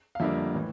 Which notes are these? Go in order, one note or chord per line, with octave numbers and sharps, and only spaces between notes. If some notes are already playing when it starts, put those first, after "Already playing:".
F5
F2 D3 G3 A#3 E5
A2 E3